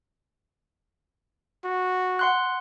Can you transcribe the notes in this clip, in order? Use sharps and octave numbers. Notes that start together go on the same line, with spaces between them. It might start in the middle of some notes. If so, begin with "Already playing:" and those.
F#4
F#5 C6 F#6